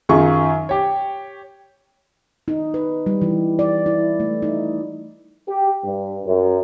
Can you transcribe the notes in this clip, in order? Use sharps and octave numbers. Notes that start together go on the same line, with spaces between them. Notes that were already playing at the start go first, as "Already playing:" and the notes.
F#2 D#3 F4 G#4 C#6
G4 C#5
D#4
B4
G3
E3
D5
E4
A3
D#4
G4
G2
F#2